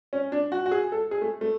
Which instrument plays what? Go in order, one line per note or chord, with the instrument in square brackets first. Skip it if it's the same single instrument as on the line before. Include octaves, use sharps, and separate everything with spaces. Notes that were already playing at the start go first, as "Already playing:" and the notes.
[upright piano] C#4
D4
F#4
F#4
G#4
A4
G#4
A3
A3